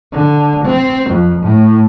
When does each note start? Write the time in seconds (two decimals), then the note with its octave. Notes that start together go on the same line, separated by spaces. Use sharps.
0.12 D3
0.65 C4
1.10 F2
1.42 A2